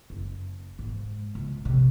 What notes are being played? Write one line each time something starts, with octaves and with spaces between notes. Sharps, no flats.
F#1
G#2
C#2
G#1 C3